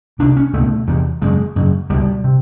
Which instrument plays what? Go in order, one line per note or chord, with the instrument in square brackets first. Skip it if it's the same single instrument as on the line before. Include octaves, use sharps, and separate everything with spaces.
[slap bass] C2 C3 D4
C#4
C#2 B2 A3
E2 C3
F#2 C#3 G#3
F#2 C#3
C#2 B2 G3
C3